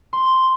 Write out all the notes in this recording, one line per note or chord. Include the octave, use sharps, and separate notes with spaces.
C6